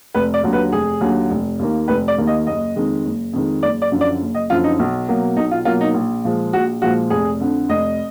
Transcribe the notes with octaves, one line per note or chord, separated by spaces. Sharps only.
F1 B4
D5
D#2 D3 F#3
B4
F1 G#4
D#2 D3 F#3
F1
D#2 D#3 A#3
F1 B4
D5
D#2 D#3 A#3
D#5
F#1 D#5
F2 D#3 G#3
F#1
F2 D#3 G#3
F#1 D5
D5
F#2 D3 F3
D5
F#1
D#5
F#2 D3 F3 F4
D#4
B1
B2 F#3 A#3
B1 D#4
F4
B2 F#3 A#3 F4
D#4
A#1
A#2 F3 G#3
A#1 F#4
A#2 F3 G#3 F#4
F1 G#4
F2 D3
F1 D#5